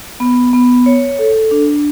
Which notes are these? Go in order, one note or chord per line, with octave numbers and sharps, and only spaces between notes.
B3
B3
C#5
A4
D4